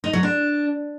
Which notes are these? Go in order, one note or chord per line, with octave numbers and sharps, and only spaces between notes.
D#4
F#3
D4